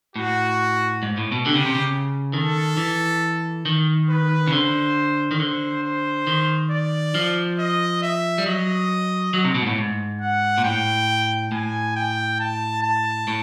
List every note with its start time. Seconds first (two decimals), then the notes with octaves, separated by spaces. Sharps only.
0.16 A2 F#4
1.03 G#2
1.17 A2
1.32 B2
1.46 D3 G4
1.55 C#3
1.66 C3
1.75 C#3
2.33 D#3 A4
2.77 E3
3.66 D#3
4.09 B4
4.48 C#3
4.52 D3 C5
5.31 D#3
5.40 D3 C5
5.83 C5
6.27 D#3
6.71 D5
7.15 F3
7.59 D#5
8.02 E5
8.38 G3
8.46 F#3 D#5
9.34 F#3
9.44 C3
9.55 B2
9.62 G#2
9.66 A2
9.78 G#2
10.21 F#5
10.58 A#2
10.64 A2 G5
11.52 A2 G#5
11.96 G5
12.40 A5
12.83 A5
13.28 A2